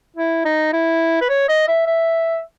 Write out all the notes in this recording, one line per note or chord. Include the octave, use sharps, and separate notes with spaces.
E4
D#4
E4
B4
C#5
D#5
E5
E5